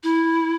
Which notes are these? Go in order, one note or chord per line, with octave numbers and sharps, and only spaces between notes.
E4